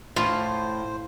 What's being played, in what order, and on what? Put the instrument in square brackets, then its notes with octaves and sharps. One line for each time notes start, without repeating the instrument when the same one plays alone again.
[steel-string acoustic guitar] A2 [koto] F4 [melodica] C5